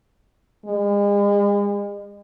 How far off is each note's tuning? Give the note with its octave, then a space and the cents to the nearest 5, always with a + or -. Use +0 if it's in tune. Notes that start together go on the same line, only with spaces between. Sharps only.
G#3 -40